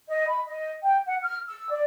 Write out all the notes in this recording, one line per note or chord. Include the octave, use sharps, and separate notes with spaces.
D#5
B5
D#5
G5
F#5
F6
E6
D5